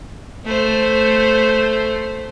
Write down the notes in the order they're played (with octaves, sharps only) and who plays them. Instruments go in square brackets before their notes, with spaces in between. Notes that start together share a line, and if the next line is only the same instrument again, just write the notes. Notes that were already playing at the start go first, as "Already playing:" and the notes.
[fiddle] A3 C5